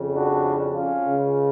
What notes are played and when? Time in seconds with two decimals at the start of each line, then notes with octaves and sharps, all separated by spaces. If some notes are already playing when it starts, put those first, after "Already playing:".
Already playing: F2 C#3
0.15 D4 F#4
0.74 C#4 F4
1.03 C#2 C#3